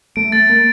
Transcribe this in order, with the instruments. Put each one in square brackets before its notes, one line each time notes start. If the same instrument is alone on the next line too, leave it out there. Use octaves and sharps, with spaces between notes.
[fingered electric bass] A3 [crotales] D7
[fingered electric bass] A3 [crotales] A6
[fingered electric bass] A#3 [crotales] A6